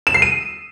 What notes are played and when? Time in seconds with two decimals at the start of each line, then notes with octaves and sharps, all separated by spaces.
0.07 E7
0.14 C7
0.22 D#7